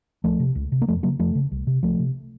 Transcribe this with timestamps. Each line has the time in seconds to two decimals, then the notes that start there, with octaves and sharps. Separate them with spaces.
0.24 C#2 F3 A3
0.39 C3
0.55 C#2
0.72 C3
0.82 A#3
0.88 F2 F3 A3
1.03 C#3 F#3 A#3
1.19 F2 F3 A3
1.35 C#3
1.52 C2
1.67 C3
1.83 C2 F3 A3
1.99 C3